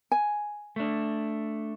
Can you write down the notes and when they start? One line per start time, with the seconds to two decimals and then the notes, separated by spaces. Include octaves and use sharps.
0.12 G#5
0.76 A3 D4